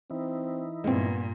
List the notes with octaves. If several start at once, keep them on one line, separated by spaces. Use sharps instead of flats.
E3 C4 D#4 E4
G2 A#2 G#3 B3 C4